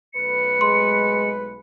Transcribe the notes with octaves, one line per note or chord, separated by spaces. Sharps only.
B1 A3 B4 C#7
G#3 C6